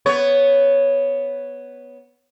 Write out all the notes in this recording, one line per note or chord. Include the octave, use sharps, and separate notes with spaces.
B3 C#5